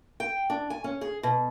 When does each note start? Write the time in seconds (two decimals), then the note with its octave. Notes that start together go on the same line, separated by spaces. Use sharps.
0.20 G5
0.50 D4
0.70 G#5
0.84 C#4
1.01 G#4
1.23 B2